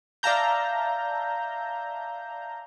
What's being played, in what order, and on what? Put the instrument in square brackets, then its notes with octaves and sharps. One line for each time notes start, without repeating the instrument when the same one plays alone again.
[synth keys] D5 E5 F5 A5 A#5 G6